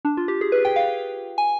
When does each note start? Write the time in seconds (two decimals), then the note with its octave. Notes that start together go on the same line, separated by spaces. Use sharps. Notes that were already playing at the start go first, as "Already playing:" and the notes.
0.05 D4
0.17 F4
0.28 G4
0.41 G#4
0.52 B4
0.65 G5
0.76 F5
1.38 G#5